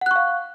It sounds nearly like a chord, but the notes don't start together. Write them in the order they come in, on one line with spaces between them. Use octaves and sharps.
F#5 F#6 C#6 F5